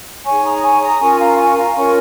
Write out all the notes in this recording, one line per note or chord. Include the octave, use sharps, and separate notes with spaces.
D#4 G#4 C#5 G#5 C#6
A#5 D#6
G#5 C#6
A#5 D#6
C#4 F4 A#4 G#5 C#6
F5 A#5
G#5 C#6
F5 A#5
C#4 F4 A#4 C#5 G#5 C#6